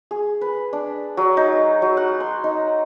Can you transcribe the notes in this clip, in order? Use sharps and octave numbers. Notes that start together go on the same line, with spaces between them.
G#4
B4
D4
F#3
D#4
F#3
F#5
C6
D#4